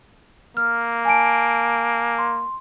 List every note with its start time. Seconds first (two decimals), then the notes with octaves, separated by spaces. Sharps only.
0.57 A#3 F6
1.05 G#5 A5 D7
2.18 C6